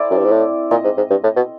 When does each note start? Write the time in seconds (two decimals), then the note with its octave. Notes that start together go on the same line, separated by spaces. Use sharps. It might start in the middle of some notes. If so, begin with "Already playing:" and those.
Already playing: C4 E4 A4 D5
0.11 F#2
0.18 G2
0.24 G#2
0.32 A2
0.71 A#2 D#5
0.84 G#2
0.97 G#2
1.10 G2
1.24 A2
1.36 B2